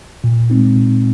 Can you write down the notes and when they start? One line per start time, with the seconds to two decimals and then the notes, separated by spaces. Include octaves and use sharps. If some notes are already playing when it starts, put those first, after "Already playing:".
0.24 A#2
0.50 G#3 C4 D#4
0.77 A#2